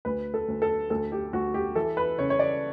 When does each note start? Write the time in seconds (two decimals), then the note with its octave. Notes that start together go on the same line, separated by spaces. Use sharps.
0.05 D2 B4
0.34 A4
0.48 D2
0.62 A4
0.90 D2 A4
1.12 G4
1.33 D2 F#4
1.54 G4
1.76 E3 A4
1.97 B4
2.18 C#3 C#5
2.30 C#5
2.39 D5